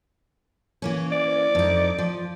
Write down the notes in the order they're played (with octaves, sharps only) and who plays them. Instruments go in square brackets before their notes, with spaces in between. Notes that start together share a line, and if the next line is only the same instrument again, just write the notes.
[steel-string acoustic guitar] E3 A#3 C#4
[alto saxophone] D5
[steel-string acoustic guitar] F2 D#4
F3